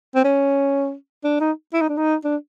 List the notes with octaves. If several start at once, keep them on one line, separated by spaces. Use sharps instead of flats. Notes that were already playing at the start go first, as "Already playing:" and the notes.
C4
C#4
D4
D#4
E4
D#4
D4
D#4
D4